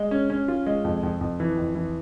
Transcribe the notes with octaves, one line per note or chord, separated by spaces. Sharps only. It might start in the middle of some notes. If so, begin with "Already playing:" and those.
Already playing: G#3
C#4
C#4
F4
G#3
F2
F2
F2
E3
F2
E3